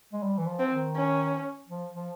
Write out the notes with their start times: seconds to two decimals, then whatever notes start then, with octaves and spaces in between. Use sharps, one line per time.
0.13 G#3
0.23 G3
0.38 E3
0.47 F3
0.59 C4
0.72 D#3
0.95 C#4
1.69 F3
1.94 F3